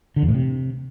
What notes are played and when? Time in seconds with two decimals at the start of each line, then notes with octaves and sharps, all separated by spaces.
0.16 D3
0.22 E2
0.28 A2
0.34 C3